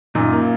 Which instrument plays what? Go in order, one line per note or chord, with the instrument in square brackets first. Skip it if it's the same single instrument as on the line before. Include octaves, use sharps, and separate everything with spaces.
[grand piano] F#2 A#2 [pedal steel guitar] D#4
[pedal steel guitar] A#3